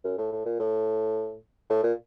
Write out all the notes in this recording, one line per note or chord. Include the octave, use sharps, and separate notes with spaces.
F#2
A2
A2
A#2
A2
A2
A#2